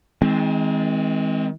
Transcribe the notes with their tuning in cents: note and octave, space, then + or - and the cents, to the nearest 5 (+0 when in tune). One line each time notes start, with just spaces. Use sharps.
D#3 +45 G#3 +0 C4 +0